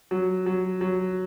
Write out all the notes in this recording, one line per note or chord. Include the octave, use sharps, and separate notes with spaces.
F#3
F#3
F#3